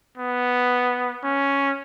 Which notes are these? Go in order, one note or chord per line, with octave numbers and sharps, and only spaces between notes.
B3
C#4